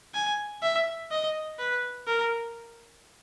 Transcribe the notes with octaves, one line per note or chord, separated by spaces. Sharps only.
G#5
E5
D#5
B4
A#4